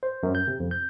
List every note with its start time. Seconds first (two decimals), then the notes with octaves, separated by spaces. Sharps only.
0.03 C5
0.23 F#2
0.35 G6
0.47 C3
0.60 F2
0.71 G6